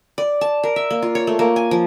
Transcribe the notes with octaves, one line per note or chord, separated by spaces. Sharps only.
D5
A5
A#4
E5
A#3
F4
C#5
A3
A#3
G#5
F3